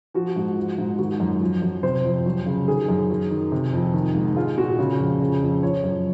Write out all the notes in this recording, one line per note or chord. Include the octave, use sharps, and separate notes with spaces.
F3 F#4
G#2
F3
G#2
D#3 F#4
F#2
F3
F#2
C3 C5
F2
F#3
C#3
D#3 G#4
F#2
F#3
D#3
C3
F2
D#3
G#2
G#3 F4
A#2 F#4
C#3
F2
C#3
F2
F3 C#5
F#2